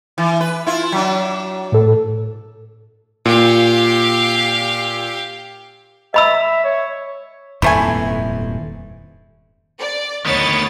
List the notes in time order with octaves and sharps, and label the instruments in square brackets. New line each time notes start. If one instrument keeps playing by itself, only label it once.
[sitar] E3
B4
E4 F4
F#3 D4
[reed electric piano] A2 A4
[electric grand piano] A#2 [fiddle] G4 F5
[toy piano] D#5 B5 E6 [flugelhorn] E5
[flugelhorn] C#5
[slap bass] D#1 F2 G#2 [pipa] E3 A3 G#5
[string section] D5
[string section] D2 C#5 A6 [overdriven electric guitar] D#3 B3